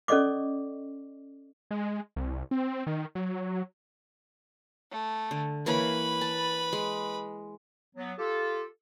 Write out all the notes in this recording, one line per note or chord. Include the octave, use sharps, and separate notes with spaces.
C#4 A4 D5 D#5 C#6 D6
G#3
C2
C4
D#3
F#3
A3
D3
E3 A#3 B4 C#5 B5
A5
G#3
F#3 B3
F4 G4 A4